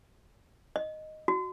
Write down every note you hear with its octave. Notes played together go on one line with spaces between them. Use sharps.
D#5
F#4